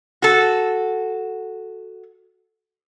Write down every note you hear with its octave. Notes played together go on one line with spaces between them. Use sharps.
F#4 A4